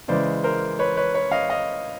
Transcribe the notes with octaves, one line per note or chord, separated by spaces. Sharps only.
C#3 E3 G#3 C5 D5
A#4 C5
B4 C#5
B4 C#5
B4 C#5
D#5 F5
D#5 F5